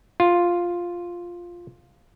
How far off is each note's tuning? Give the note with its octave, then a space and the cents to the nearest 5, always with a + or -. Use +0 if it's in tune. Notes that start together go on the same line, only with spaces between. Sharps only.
F4 +0